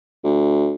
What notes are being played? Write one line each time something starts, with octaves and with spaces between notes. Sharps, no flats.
D2